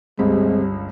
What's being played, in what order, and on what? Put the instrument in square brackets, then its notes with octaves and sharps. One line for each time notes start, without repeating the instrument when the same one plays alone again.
[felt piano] G1 C#2 B5 [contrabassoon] C3 [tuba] G3 [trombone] G#3